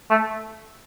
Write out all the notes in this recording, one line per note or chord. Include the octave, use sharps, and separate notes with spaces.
A3